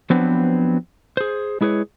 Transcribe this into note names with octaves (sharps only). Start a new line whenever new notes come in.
F3 F#3 B3 C4 D4 B4
G#4 C5
G#3 E4 G#4 B4 C#5